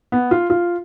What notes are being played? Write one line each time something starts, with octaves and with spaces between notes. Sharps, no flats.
B3
F4
F4